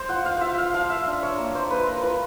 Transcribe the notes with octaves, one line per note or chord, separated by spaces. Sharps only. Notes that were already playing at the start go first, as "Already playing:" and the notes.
Already playing: C5
F4 F#5
F5
F4 E5 F5
F5
F3 F5
E5
D4
C#5
A#3
C5
F4 B4
A#4
F4 B4